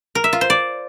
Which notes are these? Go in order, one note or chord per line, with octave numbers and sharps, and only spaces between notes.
A#4
E5
F4
C5
D5